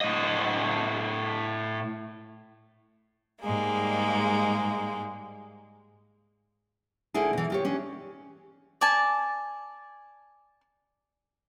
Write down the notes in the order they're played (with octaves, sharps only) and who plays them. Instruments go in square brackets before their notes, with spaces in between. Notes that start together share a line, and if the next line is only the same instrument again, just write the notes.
[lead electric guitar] A2 D#5
[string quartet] G#2 G3 G#3 A#3
[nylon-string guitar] D2 D3 E4 G#4
B2 E3
F4 G4 C#5
C#4 D4
[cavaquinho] D5 G#5 A5